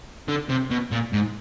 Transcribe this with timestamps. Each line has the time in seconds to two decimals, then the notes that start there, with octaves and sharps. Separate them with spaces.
0.28 D3
0.49 C3
0.71 B2
0.92 A#2
1.13 G#2